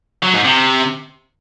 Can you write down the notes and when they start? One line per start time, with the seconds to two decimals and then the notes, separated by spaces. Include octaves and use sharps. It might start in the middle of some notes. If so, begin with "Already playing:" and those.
0.23 F#3
0.34 G#2
0.45 C3